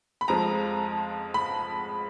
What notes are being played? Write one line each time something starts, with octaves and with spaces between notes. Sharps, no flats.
B5
F2 F3 G#3 A#5
B5